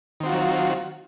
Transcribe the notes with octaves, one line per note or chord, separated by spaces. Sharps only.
D#3 F#3 C4 F4 F#4